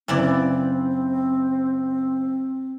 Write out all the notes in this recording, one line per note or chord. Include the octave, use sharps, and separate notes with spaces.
F#1 C#3 E3 C4 E4 D5